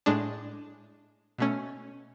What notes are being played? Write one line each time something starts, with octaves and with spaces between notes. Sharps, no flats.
A2 G#3 D4
B2 A3 C#4